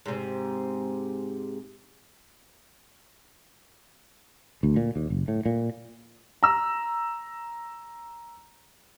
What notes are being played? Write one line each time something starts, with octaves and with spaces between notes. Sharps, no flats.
G#2 C3
D2
A#2
D#2
F#1
A2
A#2
A#5 E6